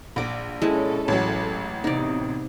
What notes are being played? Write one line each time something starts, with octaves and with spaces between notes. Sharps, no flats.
A#1 F#5 D6
G#3 C#4 E4 A4
A1 F#3
C3 B3 D#4 D5